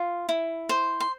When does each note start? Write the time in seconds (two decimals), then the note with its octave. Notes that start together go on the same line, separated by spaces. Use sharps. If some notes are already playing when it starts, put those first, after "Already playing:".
Already playing: F4
0.29 E4
0.69 C5
1.00 C6